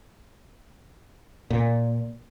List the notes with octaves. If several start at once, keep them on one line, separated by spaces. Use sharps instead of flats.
A#2